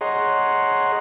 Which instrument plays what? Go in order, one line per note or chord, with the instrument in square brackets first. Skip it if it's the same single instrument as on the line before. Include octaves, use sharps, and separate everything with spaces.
[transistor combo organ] G#4 C#5 D#5 F#5 A#5 C6